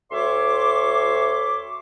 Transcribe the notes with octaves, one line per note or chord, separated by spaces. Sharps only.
D2 C#5 E5 C6 D6